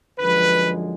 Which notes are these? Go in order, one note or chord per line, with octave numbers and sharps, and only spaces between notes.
F#2 D3 F3 G#3 B4